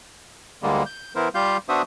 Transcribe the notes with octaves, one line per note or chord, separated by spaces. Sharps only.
D2 D3 G3 G#3 A#3
G6
E3 B3 E4 A#4 C5
G3 F4 G4 F5 G6
B3 D4 F#4 C5 E5 D#6